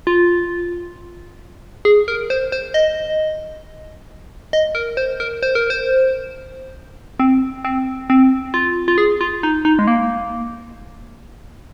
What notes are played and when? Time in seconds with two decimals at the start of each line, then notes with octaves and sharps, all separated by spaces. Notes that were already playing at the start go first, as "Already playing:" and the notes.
0.07 F4
1.85 G#4
2.08 A#4
2.30 C5
2.52 C5
2.74 D#5
4.53 D#5
4.75 A#4
4.97 C5
5.20 A#4
5.43 C5
5.55 A#4
5.70 C5
7.20 C4
7.65 C4
8.10 C4
8.54 F4
8.88 F4
8.98 G#4
9.21 F4
9.43 D#4
9.65 D#4
9.79 G#3
9.87 A#3